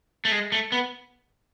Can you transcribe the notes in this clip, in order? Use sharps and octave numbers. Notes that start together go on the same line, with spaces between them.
A3
G#3
A3
B3